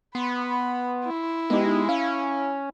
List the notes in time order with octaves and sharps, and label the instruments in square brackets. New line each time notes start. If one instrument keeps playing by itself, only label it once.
[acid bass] B3 [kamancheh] B5 [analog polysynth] C6
[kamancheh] E4
[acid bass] G#3 [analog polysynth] B3 D#4 G4
[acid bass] C#4 [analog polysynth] F5